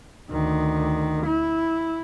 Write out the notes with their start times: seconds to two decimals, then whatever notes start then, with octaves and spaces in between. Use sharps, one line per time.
0.31 D2 D#3
1.26 E4